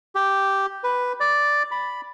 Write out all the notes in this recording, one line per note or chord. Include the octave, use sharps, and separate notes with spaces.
G4
B4
D5
B5